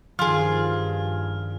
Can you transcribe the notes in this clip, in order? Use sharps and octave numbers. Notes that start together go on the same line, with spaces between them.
G2 D#3 F3 F4 G#4 F6